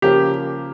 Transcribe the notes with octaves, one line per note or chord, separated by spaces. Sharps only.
C#3 F3 A#3 G4